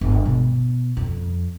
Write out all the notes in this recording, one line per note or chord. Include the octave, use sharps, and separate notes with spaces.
G1
B2
F2